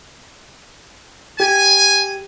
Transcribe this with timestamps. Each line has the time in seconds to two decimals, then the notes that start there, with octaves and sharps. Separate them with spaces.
1.40 G4 G#5